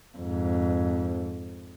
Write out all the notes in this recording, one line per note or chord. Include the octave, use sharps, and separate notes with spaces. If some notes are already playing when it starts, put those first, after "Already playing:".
F2 G#2